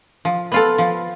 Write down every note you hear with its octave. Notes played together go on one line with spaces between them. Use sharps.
F3
B3 F4 A4
F3